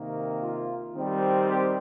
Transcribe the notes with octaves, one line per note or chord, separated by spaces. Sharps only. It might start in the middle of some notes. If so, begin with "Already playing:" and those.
Already playing: C3 D#3 A#3
F4
D#3 G3 C4
G4